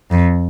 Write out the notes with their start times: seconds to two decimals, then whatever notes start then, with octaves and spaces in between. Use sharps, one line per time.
0.11 F2